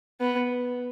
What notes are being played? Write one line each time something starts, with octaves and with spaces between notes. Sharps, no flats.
B3